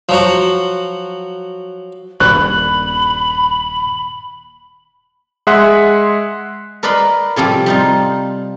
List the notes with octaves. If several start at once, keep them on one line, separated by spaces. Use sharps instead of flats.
F3 F#3 F#4
D#1 G2 A#2 B5 F#6
G#3 G#4 E5 F#5 C6 F#6
A#4 B4 D5 D#5 B5 C6
A2 C3 F3 G3
G3 D#4 F4